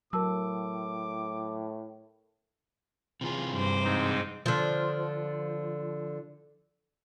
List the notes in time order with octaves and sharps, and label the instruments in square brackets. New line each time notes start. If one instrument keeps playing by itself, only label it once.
[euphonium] A2 [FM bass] F#3 [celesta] A#4 A5 E6 [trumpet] D6
[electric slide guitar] C3 E3 G#4 [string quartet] F4
[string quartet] G2 C5 D6
[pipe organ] G#2 C4 D#4
[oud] D3 F3